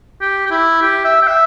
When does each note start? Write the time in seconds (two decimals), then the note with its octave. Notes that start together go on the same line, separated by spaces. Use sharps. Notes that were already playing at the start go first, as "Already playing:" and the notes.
0.21 G4
0.46 G4
0.51 E4
0.82 G4
1.05 E5
1.22 G5
1.27 E5